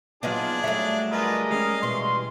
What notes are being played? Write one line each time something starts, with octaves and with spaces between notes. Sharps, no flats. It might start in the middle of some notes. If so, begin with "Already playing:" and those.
A#2 F#3 B3 D4 D#4 F4 G#4
F#3 G3 A3 C#5 E5
D3 F4 G#4 A#4 B4 D#5
G3 G#3 C#4 F5
B2 E3 C6